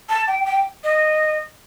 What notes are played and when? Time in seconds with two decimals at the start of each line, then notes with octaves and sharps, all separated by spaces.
0.09 A5
0.27 G5
0.46 G5
0.84 D#5